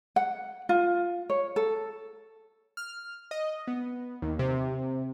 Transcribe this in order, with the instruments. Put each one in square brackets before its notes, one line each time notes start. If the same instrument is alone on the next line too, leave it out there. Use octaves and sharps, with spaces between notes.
[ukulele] F#5
F4
C#5
A4
[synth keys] F6
D#5
B3
D#2
C3